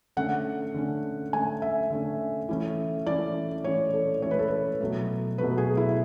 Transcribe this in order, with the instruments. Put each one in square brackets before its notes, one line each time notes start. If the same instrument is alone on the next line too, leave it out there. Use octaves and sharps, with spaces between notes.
[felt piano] D3 A3 C#4 F#5
D3 A3 C#4
D3 A3 C#4 G#5
E5
D3 A3 C#4
E3 A3 C#4
E3 A3 C#4 D5
E3 A3 C#4 C#5
A4
E3 A3 C#4 C#5
B4
A4
B4
B2 F#3 A3
B2 F#3 A3 B4
G#4
E4